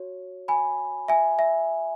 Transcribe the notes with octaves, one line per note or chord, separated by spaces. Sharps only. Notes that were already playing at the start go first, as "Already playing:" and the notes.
Already playing: F#4 C#5
G#5 B5
E5 G#5
E5